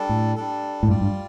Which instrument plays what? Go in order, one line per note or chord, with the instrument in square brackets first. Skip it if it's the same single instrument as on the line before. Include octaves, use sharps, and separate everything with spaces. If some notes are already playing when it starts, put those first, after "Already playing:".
Already playing: [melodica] G3 D4 A4
[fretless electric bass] A2
[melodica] G3 D4 A4
[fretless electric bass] A2
[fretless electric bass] G2 [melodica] G3 F4 D5
[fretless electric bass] G2